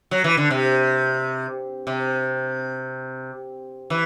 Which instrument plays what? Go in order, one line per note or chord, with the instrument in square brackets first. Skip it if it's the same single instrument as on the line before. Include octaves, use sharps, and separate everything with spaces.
[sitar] F#3
E3
D3
C3
C3
E3